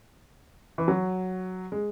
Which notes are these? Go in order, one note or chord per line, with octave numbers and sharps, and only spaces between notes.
E3
F#3
G#3